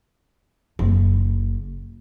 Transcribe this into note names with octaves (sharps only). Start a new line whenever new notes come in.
F#1